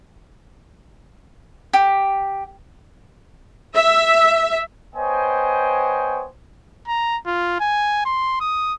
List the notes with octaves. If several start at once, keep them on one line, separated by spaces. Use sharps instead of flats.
G4
E5
B3 C5 C#5 D#5 G5 G#5
A#5
F4
G#5
C6
D#6